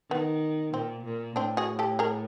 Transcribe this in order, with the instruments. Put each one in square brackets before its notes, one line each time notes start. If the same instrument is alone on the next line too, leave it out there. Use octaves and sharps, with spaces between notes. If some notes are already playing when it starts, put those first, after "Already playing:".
[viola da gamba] D#3 [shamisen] B3
[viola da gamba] A#2 [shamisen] C4
[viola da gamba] A#2
[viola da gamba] A2 [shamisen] C4 D4
[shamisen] F#4 G#4
G4 A4
G#4 A#4